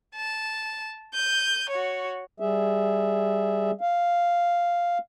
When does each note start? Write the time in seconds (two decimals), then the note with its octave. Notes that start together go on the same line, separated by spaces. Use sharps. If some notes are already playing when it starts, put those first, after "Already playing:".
0.16 A5
1.14 G6 D#7
1.69 F#4 C#5
2.40 G3 G#4 E5
3.81 F5